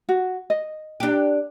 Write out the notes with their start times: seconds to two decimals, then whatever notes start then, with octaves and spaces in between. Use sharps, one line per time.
0.09 F#4
0.50 D#5
1.00 D4 G4